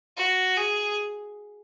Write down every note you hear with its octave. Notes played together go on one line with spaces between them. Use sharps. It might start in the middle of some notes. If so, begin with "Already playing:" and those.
F#4
G#4